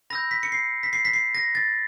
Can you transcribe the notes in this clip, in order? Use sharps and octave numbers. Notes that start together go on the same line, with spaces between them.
B5 E6 G6 A#6
B6
C#7
C7
B6
C7
B6
C7
A#6
A6